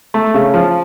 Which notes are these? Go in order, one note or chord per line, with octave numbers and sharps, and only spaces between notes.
A3
C#3
F3